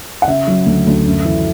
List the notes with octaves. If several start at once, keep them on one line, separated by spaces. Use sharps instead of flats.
F#5
C#3 E5
F#3
D2
D2
F#2
E3